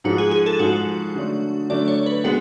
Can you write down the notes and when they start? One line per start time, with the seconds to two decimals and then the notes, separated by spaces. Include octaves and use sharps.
0.04 G#2 F3 G#3 F#4
0.18 G#4
0.31 G#4
0.46 A4
0.59 G#2 F3 G#3 F#4
1.14 D3 F#3 A3 D4
1.69 D3 F#3 A3 D4 D5
1.88 C#5
2.06 B4
2.24 G#3 B3 F#4